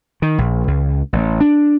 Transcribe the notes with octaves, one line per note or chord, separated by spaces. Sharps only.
D#3
A#1
C#2
A1
D4